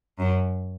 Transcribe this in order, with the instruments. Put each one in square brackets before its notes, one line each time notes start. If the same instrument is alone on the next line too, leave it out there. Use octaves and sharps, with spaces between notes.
[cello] F#2